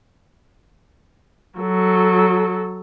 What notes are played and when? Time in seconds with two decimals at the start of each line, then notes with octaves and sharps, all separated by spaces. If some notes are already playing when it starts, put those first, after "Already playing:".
1.60 F#3 A4